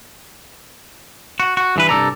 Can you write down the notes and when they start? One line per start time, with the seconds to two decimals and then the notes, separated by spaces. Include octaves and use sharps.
1.40 F#4
1.57 F#4
1.76 G2 E3 B4
1.89 C2 G2 D#3 A4 D5 A#5